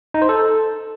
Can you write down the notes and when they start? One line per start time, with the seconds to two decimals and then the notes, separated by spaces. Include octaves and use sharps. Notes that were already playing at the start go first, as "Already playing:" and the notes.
0.14 D#4
0.22 C5
0.29 A4